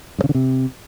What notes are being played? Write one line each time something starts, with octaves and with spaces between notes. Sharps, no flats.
G2
C#3
D3
C3